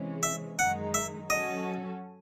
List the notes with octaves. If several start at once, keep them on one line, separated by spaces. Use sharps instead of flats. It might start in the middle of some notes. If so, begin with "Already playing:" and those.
Already playing: C3 E3 G#3 C#4
E5
F#2 D#3 G#3 D#4 F#5
E5
F#3 C#4 F#4 A4 D#5